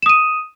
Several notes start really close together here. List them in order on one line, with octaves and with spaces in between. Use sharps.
E7 D#6 D#7